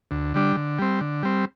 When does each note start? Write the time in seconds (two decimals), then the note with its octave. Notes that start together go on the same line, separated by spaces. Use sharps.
0.11 D2
0.34 D3 G3 D4
0.56 D3
0.79 G3 C4
1.01 D3
1.23 G3 C4